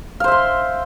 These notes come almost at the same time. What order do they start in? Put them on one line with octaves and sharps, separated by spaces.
F5 C5 E5 C6